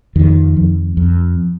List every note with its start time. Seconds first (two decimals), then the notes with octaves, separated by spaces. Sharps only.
0.16 F2 D#3
0.57 F2
0.97 F2